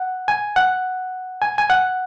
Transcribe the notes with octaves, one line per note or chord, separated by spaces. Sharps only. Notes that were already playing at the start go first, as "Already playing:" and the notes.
Already playing: F#5
G#5
F#5
G#5
G#5
F#5